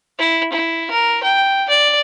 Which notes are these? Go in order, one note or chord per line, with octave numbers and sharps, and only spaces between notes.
E4
E4
A#4
G5
D5